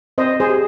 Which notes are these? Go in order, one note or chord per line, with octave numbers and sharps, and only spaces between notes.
C4 C5 D#5
G#4 C5
G4